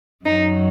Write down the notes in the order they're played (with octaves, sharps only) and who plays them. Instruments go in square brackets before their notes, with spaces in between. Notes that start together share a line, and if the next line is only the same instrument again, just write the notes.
[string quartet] F#2 D#3 F#3 D#4